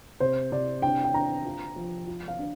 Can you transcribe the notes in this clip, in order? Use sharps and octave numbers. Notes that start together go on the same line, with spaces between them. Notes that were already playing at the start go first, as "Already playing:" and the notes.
C3 C5
C3 D5
D4 G5
G5
D4 A#5
F4
F3
F4
F5
D4